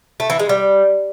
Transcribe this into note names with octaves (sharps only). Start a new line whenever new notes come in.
A3
E3
G#3
G3